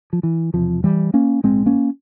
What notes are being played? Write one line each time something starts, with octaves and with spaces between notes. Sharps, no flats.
F3
E3
E1 E2 C3 F3
E3 G3
A#3 C#4
A#1 G#2 G#3 C4
A#3 C#4